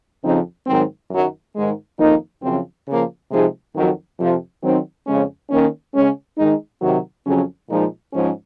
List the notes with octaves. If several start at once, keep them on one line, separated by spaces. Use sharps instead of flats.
F2 C#3 F3 C4 D#4
G#2 D#3 F#3 C4
F#2 D#3 F#3
G#2 D#3 G#3
F2 D#3 A#3 D#4
F#2 C#3 F3 C4
C#3 F3 A#3
C3 F3 G#3 D#4
F2 D#3 F#3
F2 C3 F3
D#3 F#3 C4 D#4
F2 C#3 G#3 C#4
D#3 A#3 C#4
C#3 G#3 C#4
D#3 G#3 D#4
C3 D#3 F#3
F2 C#3 F#3 C#4
A#2 F3 G#3 D#4
G#2 F3 G#3 C#4